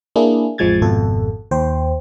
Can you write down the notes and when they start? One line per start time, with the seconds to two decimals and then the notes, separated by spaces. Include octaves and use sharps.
0.16 A#3 D4 E4 G#4
0.58 A1 F2 F3 G#3 G#6 A6
0.82 G#1 F2 B2 A4
1.51 D#2 C5 G5